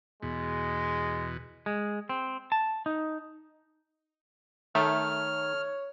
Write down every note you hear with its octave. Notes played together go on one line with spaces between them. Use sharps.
E2 B2 G#3
G#3
C4
A5
D#4
D#3 A3 C#5 F6